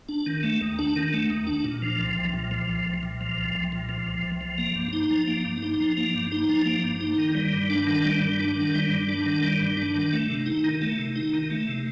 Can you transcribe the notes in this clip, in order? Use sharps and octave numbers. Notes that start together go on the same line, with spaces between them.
D4
D#3
A3
D#2
D4
D#3
A3
D#2
D4
A#2
F3
C2
C2
A#2
F3
C2
C2
A#2
F3
C2
C2
A#2
F3
C2
C2
F3
A#3
G2
D#4
F3
A#3
G2
D#4
F3
A#3
G2
D#4
F3
A#3
G2
D#4
D#3
G3
G2
D4
D#3
G3
G2
D4
D#3
G3
G2
D4
D#3
G3
G2
D4
D#3
A3
C3
D#4
D#3
A3
C3
D#4
D#3
A3
C3